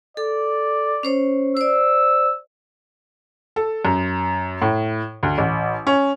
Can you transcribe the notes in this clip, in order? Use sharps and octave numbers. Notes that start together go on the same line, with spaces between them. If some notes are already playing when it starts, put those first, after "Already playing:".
A4 D5
C#4 C5 C#5
C5 D5 E6
A4
F#2
A2
D2
A1
C#4